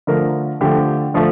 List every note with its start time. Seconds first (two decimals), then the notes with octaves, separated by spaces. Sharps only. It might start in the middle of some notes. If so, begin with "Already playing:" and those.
0.07 D3 F3 A3 A#4
0.61 D3 F3 A3 G4
1.14 D3 F3 A3